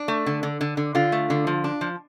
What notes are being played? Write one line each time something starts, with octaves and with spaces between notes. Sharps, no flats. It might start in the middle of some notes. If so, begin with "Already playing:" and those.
Already playing: D4
A3
D3
D3
D3
D3
D3 F4
A3
D3
F3
D4
F3